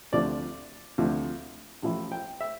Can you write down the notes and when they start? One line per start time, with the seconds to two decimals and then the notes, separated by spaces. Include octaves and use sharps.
0.12 D2 C3 F3 D5
0.98 D2 C3 F3
1.82 A1 A2 F3 A3 E4
2.12 G5
2.41 E5